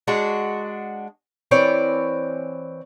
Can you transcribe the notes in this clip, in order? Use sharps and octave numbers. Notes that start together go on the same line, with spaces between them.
G#3 D4 F#4
E3 C4 C#5 D5